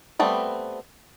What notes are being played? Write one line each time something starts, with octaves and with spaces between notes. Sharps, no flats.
G3 A3 B3 C4